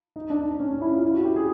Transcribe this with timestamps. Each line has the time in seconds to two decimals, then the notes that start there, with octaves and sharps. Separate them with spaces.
0.16 D#4
0.30 D4
0.45 D4
0.60 C#4
0.71 C#4
0.81 E4
0.93 F4
1.03 E4
1.14 F#4
1.25 G4
1.36 G#4